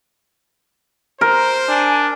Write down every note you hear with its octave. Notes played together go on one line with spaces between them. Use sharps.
A#4 C5
D4 G#5